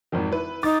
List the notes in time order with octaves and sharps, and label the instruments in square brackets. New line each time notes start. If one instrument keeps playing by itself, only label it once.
[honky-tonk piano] G#1 F2 D#3
E4 B4
[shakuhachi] D#4 [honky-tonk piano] D6 A6